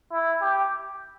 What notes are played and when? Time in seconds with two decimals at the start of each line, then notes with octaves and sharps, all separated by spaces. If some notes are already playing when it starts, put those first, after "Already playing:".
0.12 E4
0.42 G4